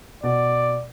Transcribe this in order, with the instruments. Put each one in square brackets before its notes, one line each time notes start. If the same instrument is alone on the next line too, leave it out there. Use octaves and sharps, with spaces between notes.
[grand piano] B2 [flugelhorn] D5